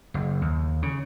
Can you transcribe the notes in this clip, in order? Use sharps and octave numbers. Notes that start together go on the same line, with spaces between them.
F#1
D#2
C#3